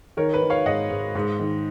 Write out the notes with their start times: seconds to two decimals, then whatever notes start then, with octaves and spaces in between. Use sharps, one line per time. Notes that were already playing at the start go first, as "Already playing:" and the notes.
0.17 D#3 A#4 C#5
0.34 B4
0.42 D#3
0.50 C#5 F5
0.66 G#2 D#5 F#5
0.91 G#2
1.15 G#2
1.40 D#3